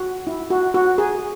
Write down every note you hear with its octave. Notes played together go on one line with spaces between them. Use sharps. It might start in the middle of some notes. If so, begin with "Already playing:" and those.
Already playing: F#4
E4
F#4
F#4
G#4